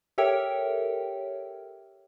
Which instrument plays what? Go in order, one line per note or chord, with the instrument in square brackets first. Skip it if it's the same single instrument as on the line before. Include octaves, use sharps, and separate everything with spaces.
[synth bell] G4 A4 A#4 C#5 E5 G5